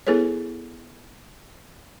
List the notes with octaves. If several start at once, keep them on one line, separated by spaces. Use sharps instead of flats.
B3 E4 G#4 A4 B4 C#5